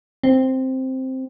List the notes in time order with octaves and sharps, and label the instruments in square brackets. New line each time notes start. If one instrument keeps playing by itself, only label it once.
[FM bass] C4